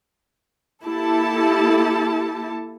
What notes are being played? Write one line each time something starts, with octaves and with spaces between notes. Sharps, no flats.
A#3 E4 G4 A4 A5